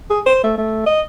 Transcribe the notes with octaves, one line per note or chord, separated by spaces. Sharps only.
G#4
C5
A3
A3
D#5